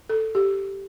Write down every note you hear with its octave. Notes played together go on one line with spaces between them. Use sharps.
A4
G4